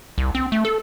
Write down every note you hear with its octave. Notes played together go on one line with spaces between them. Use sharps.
C2
C4
A3
A4